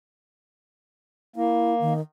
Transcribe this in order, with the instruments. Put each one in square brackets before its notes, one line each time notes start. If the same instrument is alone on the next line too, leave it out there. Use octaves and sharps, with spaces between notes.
[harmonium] A#3 [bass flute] E4
[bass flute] D#3